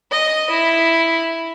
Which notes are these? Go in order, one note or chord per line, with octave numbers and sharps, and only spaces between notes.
D#5
E4